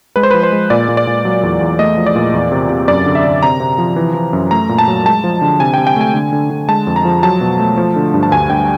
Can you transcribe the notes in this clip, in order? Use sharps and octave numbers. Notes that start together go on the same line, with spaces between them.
G#3 B4
C5
F3 B4
C5
G#3
A#2 D5
A#2
D5
A#2
F#3
E2
E2
A3 D#5
F3
D5
A#2
E2
C3
C3
F#2 D5
D3
E5
D3
C3 A#5
C3
F3
E3
E3
F#2
A3 A#5
A#2
A5
F#3
G#3 A5
F3
D3
C3 G#5
G5
C3
G5
A3 G#5
D3
D3
D3
G#3 A5
F2
A#5
F3
F#3 A5
B2
A3
F3
D3
G2
A5
D2 G#5
D2 G5